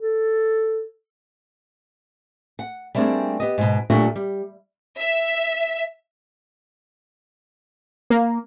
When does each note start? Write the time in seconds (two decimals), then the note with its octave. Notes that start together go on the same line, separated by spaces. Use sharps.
0.01 A4
2.59 F#5
2.95 G3 A3 A#3 C4 D4 G#4
3.40 B3 G4 D#5
3.58 G#2 B2
3.90 A#2 F#3 G3 A3 D4 F#4
4.16 G3
4.99 E5
8.10 A#3